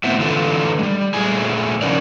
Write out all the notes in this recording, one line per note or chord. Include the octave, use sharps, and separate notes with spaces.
A2 B3 C4 E5
D3 E3 F4 A4 B4
G3 G#3
A#2 A3 G#4 G#5
C#3 F3 C#4 D#4 A#4 D5